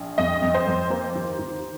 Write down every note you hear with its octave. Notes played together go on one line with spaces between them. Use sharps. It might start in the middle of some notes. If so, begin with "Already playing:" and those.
Already playing: A#1
F2 D#5
F2
C5
F2
A#3 C5
D#2
D#2